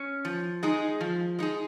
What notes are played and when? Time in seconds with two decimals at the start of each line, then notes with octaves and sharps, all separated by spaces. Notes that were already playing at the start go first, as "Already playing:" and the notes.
Already playing: C#4
0.25 F3
0.63 G#3 D#4 G#4
1.01 F3
1.39 G#3 D#4 G#4